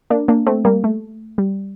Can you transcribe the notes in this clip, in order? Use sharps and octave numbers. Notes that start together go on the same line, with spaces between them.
A#3 D4
A#3 D4
A3 C4
G3 A#3
A3
G3